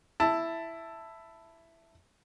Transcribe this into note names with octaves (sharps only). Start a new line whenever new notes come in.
E4 A5